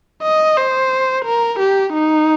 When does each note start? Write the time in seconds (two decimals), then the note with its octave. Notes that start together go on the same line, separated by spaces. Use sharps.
0.23 D#5
0.57 C5
1.25 A#4
1.60 G4
1.93 D#4